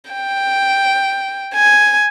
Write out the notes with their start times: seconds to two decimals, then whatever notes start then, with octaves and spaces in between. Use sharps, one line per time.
0.11 G5
1.54 G#5